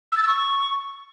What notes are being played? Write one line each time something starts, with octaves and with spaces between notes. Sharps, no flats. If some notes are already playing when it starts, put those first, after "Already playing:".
E6
A6
E6
C#6